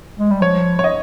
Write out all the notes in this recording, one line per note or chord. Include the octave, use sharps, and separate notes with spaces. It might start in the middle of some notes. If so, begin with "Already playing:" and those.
G#3
G3
F3 C#5
C#5
D#5